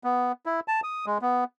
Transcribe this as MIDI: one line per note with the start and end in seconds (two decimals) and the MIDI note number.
0.04 0.32 59
0.46 0.60 64
0.68 0.81 81
0.83 1.06 87
1.06 1.18 56
1.22 1.44 59